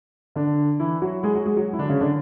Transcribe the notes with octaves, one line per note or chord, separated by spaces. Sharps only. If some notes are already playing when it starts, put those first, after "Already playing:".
D3 D4
E3 E4
F#3 F#4
G#3 G#4
F#3 F#4
G#3 G#4
F#3 F#4
E4
D3 D4
C#3 C#4
D3 D4